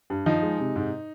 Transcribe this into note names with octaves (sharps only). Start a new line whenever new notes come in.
G2
F3 D#4
G#3
C3
G#2